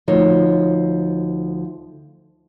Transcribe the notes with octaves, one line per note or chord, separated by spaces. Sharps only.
D2 F3 D#4 C#5